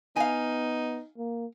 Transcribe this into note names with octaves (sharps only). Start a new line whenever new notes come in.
B3 D#4 F5 G#5
A#3